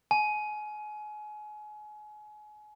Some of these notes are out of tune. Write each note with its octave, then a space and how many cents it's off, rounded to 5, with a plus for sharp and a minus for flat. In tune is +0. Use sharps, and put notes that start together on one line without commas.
G#5 +30